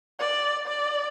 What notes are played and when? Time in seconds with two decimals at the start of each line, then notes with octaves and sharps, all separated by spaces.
0.20 D5
0.67 D5